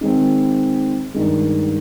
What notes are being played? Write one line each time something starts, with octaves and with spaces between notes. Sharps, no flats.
D#3 G#3 C4
G2 D#3 G#3